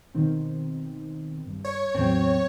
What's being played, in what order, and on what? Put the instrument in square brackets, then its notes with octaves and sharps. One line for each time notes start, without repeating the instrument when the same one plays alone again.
[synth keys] B2 D#3 C4
G2
[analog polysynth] C#5
[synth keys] E2 A2 F#3 [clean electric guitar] C4